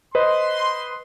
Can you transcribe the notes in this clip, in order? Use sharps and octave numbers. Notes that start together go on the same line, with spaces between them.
B4 C5 D#5 C6